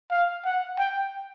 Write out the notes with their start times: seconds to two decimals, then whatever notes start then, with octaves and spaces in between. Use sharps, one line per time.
0.11 F5
0.45 F#5
0.78 G5